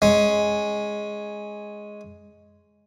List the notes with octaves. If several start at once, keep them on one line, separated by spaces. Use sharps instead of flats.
G#3 C#4